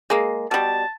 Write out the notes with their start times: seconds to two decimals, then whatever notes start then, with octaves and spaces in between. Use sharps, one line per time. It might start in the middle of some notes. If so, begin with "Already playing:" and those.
0.10 G#3 A#3
0.51 B2 G3 A5